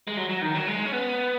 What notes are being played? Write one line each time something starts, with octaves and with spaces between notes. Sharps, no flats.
G#3
F#3
F#3
D#3
F#3
G#3
C#4
B3